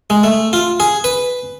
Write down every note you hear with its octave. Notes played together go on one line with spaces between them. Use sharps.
G#3
A3
F4
G#4
B4